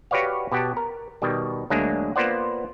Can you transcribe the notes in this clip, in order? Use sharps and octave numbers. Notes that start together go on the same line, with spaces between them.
F#4 G4 B4 C#5 D5 F5
B2 G4 F#5 A5
A#4
B2 D#3 G3
D2 F#3 G#3 A#3 D4
A#3 B3 F4 C5 D5 F#5